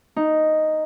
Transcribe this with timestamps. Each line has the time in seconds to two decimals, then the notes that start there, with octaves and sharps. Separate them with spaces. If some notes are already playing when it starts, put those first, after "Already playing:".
0.16 D#4